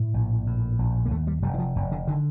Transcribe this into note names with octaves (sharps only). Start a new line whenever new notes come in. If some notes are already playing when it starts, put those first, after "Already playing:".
Already playing: A2
A#1
A2
A#1
A#3
D#2 A3
G3
F1 G3
D#3
F3
F1
D3
D3 D#3